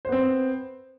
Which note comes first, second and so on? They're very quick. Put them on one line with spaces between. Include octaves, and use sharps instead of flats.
C5 B3 C4